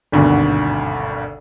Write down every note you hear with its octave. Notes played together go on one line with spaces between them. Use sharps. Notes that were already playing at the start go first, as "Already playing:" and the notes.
G#1 D2 G2 B2